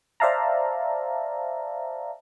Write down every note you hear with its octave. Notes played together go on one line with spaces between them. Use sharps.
C5 D5 E5 F5 A5 A#5